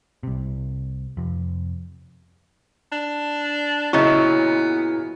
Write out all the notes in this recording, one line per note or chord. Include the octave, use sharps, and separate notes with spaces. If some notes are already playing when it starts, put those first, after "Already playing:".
C2 C3
F2 C3
D4
A#2 C#3 F#3 B3 E4 D#5 C#6